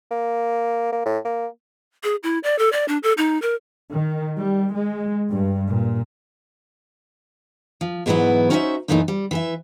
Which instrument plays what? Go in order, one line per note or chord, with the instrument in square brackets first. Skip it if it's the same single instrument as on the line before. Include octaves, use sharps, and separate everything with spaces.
[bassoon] A#3
A#3
A2
A#3
[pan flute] G#4
E4
D5
A4
D5
D4
A4
D#4
A#4
[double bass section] D#3
G3
G#3
G2
A#2
[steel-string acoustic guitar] F3
G#2 B2 E3 F#3 B3 E4
C#4 D#4 F#4 C5 D#5 E5
F#2 A#2 E3 A3 C#4 D#4
G3
E3 G#4 E5